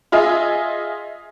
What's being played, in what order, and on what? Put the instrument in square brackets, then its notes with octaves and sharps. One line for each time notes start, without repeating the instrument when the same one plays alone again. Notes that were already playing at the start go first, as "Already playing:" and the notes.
[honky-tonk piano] F4 G#4 D#5 E5